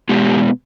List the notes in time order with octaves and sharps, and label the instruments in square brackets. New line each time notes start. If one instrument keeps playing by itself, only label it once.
[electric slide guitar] B2 G#3 B3 G4